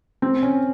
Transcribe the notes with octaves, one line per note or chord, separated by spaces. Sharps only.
C4
C#4